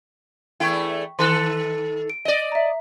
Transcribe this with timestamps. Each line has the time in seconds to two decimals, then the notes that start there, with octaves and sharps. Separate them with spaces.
0.60 E2 A3 E4 G5 C#6
1.19 D#3 A4 C6 F#6
2.10 D7
2.25 D5 D#5
2.52 E5 A#5